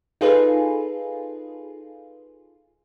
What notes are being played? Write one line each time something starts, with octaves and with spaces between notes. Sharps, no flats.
D#4 F4 G#4 A4 B4